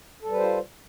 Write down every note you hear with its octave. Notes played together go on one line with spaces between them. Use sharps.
G3 F4 A4 B4 C5